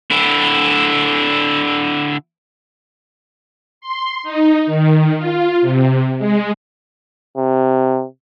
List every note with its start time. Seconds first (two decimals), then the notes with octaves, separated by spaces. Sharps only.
0.10 D3 E4
3.81 C6
4.23 D#4
4.66 D#3
5.18 F4
5.61 C3
6.19 G#3
7.37 C3